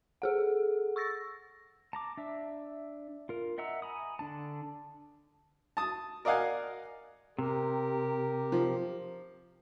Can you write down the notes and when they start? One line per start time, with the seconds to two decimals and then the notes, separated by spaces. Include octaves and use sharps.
0.22 G#4 A4 F#5
0.96 C#6 E6 A6 A#6
1.93 A5 A#5 D6
2.17 D4 E5
3.29 F4 A#4
3.58 D#5 E5 F#5 A#5 E6
3.82 G#5 A#5 B5 D#6
4.19 D3 D4 A5
5.77 A5 D#6
6.25 A#4 D5 D#5 F5 F#5 G#5
7.38 C3 G4 A#4
8.52 F3